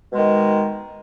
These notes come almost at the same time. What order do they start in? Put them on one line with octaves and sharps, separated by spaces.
B2 G#3 D#3